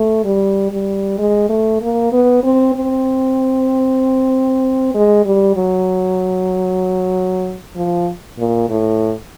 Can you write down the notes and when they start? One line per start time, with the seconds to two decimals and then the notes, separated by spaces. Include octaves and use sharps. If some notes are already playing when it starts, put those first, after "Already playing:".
Already playing: A3
0.24 G3
0.71 G3
1.18 G#3
1.49 A3
1.82 A#3
2.12 B3
2.44 C4
2.75 C4
4.94 G#3
5.25 G3
5.56 F#3
7.76 F3
8.39 A#2
8.70 A2